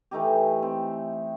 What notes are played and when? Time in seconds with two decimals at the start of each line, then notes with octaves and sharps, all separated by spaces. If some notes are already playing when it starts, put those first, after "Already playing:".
0.11 E3 A3 D#4 G4
0.62 C4